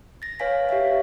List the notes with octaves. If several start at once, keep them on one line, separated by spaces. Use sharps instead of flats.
A6 A#6
B4 C#5 F5 G#5 B6
G4 C#5 E5 F5